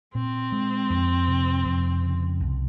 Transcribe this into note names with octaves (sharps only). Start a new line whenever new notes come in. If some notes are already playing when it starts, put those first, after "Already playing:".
A#2 C4
G#3
F2
C3
F2
C#3
C2